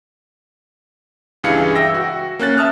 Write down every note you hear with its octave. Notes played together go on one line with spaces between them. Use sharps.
C#2 G2 E3 G#4 F5 C#7
E5 G5 E6 A#6
F#4
A#3 C#4 F#6 A6
E5 A5 D#6 F6 F#6